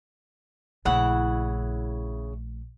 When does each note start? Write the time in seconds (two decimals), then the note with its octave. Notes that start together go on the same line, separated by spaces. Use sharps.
0.85 A#1 C#3 A3 E4 F#5